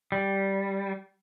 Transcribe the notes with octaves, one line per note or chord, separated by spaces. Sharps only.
G3